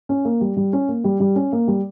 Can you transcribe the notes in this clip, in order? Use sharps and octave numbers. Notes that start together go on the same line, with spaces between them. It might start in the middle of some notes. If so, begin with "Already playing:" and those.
C#4
A#3
G3
G3
C#4
A#3
G3
G3
C#4
A#3
G3